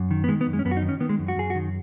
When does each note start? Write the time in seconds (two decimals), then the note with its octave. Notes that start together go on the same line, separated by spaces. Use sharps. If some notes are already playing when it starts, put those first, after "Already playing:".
Already playing: F#2
0.11 D#3
0.24 B3
0.28 D#3 G#3
0.41 B3
0.47 F#2
0.53 G#3
0.59 C#4
0.65 F#2 B3
0.71 F#4
0.77 D#4
0.82 D#3
0.89 C#4
1.00 D#3 B3
1.09 G#3
1.19 F#2
1.28 F#4
1.36 F#2 G#4
1.50 F#4
1.55 D#3